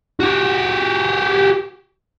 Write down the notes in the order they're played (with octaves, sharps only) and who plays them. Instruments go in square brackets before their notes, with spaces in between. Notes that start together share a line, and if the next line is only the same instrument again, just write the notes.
[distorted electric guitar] F#4 G4